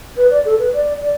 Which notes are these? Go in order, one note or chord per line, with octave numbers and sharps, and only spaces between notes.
B4
D5
A4
B4
D5
D5